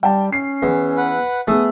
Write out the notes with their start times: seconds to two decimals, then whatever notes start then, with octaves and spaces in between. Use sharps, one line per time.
0.03 G3 G5 A5
0.33 C#4 C7
0.62 E2
0.97 B4 F#5
1.48 A3 B3 G#4 D#6